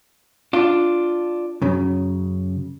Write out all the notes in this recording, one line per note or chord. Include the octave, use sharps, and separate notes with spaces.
D4 F4
F#2 C#3